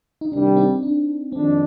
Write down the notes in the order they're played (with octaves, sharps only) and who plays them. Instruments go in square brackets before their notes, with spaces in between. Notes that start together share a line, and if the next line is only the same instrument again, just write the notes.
[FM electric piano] D#4
[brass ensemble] C2 C3 D#3 G3 [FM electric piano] D4
[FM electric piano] C4 D#4
D4
[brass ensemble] F2 D#3 G#3 D4 [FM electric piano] C4